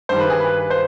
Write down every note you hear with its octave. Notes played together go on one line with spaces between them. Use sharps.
G2 D#3 G3 C5
B4
G#4
B4
B4
C5